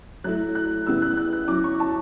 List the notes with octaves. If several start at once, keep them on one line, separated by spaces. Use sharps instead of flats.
F#3 A3 E4 F#6
F#6
C#3 G3 B3 E4 E6
F#6
F#6
F#6
F#3 C#4 E4 D6
C#6
A5